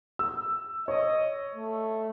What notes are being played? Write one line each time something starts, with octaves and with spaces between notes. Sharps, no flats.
E6
C#5 D#5
A3